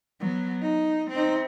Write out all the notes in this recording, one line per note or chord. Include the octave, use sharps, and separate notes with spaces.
F#3 B3
D#4
C4 D#4